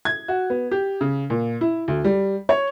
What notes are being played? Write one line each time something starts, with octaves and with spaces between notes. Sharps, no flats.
G#6
F#4
B3
G4
C#3
A#2
E4
D2
G3
C#5